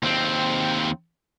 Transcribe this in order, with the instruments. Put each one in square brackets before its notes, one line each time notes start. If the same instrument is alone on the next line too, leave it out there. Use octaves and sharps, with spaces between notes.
[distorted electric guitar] D#2 C4